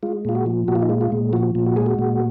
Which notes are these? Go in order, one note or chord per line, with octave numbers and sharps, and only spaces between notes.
G#3 F4
A#2 F4
F#4
F3
A#2 F#4
F4
D#4
G#3 F4
F4
A#2
F3 F#4
A#2
F#4
G#3 G#4
F#4
A#2